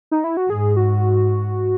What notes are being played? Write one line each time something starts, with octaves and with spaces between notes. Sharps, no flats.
D#4
E4
F#4
G#2 G#4
F#4